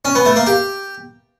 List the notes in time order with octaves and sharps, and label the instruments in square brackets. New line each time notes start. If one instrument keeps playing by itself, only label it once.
[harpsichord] C#4
B3
A3
A#3
G4